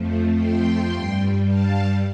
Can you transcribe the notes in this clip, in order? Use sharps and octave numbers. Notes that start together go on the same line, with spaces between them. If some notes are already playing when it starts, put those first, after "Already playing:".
Already playing: F2 F3 A3
G5 C6
G2 G3
F5 A5